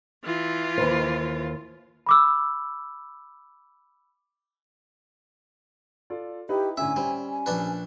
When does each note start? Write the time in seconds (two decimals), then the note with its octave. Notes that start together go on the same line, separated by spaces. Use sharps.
0.24 E3 F4
0.78 D#2 B4 C5
2.06 B5 D6 E6
6.10 F4 A4 D5
6.49 D#4 E4 G4 B4
6.77 A2 D3 C#4 E5 G#5
6.96 G3 C4 C#4
7.30 G#5
7.46 A#1 D4 B4